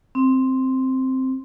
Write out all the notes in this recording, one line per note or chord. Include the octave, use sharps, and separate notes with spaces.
C4